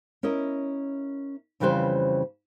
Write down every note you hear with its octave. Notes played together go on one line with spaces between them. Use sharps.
C#4 E4 A#4 D#5
F2 C#3 E3 G3 B4 C5